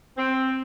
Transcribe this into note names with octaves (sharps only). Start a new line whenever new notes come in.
C4